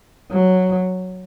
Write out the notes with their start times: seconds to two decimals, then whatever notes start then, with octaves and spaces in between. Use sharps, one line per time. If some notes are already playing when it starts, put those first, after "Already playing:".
0.31 F#3